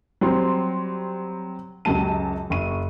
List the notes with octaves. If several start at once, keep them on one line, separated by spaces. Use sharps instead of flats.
F#3 G3 C4 C6
C#2 F#2 F#3 G4 A5 D#7
F#1 C#6 D#7